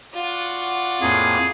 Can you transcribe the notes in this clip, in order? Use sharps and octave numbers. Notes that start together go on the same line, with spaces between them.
F4 F#4 D5 F#5
F2 A2 A#3 G#4